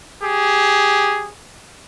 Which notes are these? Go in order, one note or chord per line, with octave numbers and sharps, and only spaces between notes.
G4 G#4